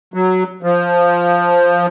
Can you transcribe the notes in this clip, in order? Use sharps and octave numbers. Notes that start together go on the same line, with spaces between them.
F#3
F3